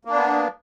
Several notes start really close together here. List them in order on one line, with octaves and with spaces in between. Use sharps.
A#3 D4 B3